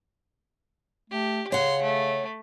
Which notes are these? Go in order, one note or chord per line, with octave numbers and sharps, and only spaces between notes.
A3 G4
C#3 C#5 F#5 C6
A3